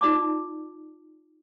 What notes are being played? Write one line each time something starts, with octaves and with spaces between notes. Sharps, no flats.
D#4 F4 D5 A5 D6